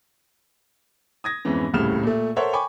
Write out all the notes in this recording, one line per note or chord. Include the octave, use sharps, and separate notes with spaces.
D#6 G#6 A#6
F2 G#2 E3 B3 C#4
D#1 C2 A2 C#3 F6 E7
A#2 A3
A4 A#4 C5 C#5 E5 F#5
G5 G#5 B5 C#6 D6